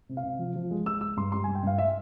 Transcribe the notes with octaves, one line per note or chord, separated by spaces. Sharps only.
C3
F5
C3
F3
F3
G#3
G#3 E6
G#3 E6
G2 C6
G3 C6
G#5
G2
G5
G2 F5
E5